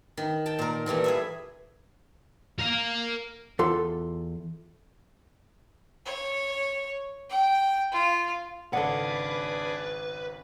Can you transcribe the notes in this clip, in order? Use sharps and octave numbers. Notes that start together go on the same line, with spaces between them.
D#3
G5 A5
A#2 A#4
A#2 E3 G3 A3
G#4 B4 E5
A#4 F5
E2 F4 A4 C6
C#5
G5
F4
G#1 C#3 D4 G#4 A4 B4 D5 F#5